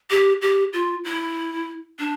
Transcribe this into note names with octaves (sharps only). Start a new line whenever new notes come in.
G4
G4
F4
E4
D4